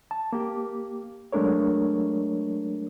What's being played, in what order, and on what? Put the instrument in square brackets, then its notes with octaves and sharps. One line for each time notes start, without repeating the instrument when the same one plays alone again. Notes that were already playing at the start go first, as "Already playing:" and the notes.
[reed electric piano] A5
A#3 G4
F#3 G#3 A3 D4 A#4 C#5